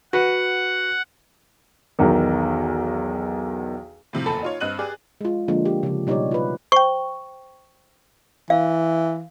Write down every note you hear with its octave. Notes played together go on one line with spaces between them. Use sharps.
F#4 B4 F#5
B1 E2 D#3
A2 C3 F3
F#1 E2 A4 A5 B5
D#4 F4 C#5
G2 C4 D#5 F#6 D#7 F#7
G4 G#4 D5
G#3 F4
D3 F3 G#3 A#3 D4
G4
C#3 F3
B2 G3 D#4 G4 C#5 D5
F4 B4
C5 G5 C#6
E3 F5